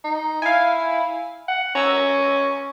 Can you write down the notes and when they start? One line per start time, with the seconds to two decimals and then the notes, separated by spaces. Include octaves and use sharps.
0.04 D#4
0.42 E4 F5 G#5
1.48 F#5
1.75 C#4 A#5 E6 A#6